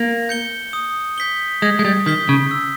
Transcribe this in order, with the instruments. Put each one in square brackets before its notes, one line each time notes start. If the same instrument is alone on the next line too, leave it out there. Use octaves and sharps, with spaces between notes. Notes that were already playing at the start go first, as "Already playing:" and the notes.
Already playing: [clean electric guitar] A#3
[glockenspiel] G6 C#7 G7
D#6
G6 B6 G7
[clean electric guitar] G#3 [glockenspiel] D#6
[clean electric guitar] G#3
G3
[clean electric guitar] D#3 [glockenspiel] G6 B6 G7
[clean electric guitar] C#3
[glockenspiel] E6